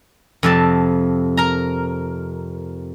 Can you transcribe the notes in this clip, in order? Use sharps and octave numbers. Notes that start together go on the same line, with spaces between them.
F2 C3 A5
A#4 A#5